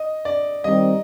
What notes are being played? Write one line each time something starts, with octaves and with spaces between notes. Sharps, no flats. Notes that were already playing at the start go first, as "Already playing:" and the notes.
Already playing: D#5
D5
D#3 G3 C4 D#4 D#5